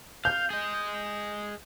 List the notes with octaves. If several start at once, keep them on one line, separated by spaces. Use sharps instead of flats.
F5 G6
G#4 D#5